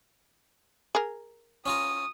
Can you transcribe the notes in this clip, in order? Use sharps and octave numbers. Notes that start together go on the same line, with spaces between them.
G#4 A#4
C#4 F4 A#5 D#6